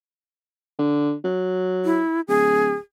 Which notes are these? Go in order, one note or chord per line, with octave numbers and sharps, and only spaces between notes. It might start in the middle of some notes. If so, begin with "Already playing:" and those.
D3
F#3
E4
D1 G#4